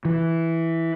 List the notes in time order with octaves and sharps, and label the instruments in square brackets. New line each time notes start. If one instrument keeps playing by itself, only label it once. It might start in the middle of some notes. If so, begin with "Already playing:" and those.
[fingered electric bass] E3